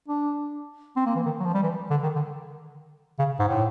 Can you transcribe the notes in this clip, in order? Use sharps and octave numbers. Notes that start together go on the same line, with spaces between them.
D4
C4
A#3
E3
D#3
F#3
F3
G3
E3
D3
D#3
D3
C#3
G#2
A2